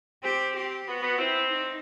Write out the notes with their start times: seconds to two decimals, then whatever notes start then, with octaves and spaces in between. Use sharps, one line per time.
0.24 C4 G4
0.56 G4
0.87 B3 F#4
1.03 B3
1.18 C4 E4
1.51 D#4